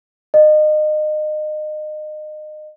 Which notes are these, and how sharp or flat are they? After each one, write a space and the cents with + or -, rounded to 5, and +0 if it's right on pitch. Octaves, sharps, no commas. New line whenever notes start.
D#5 -30